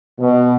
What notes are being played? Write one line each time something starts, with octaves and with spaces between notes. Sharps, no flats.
B2